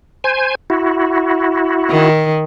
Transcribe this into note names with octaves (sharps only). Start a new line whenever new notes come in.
C5 G#5
E4 F#4
D#3